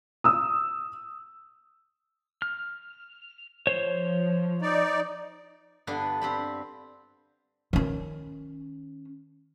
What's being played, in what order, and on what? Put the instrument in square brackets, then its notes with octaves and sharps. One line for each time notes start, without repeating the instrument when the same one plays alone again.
[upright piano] D#6 E6
[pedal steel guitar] F6
[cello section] F3 [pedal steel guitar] C5 C#5
[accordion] D#4 D5
[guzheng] G2 D3 B3 D4 G4
C4 G4 B5
[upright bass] D#3 C#4